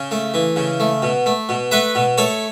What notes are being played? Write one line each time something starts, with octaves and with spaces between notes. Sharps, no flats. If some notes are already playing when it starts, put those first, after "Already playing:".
Already playing: C#3
A3
E3
C#3
A3
B2
A3
B2
A3 B4 E5
B2
A3 A4 C#5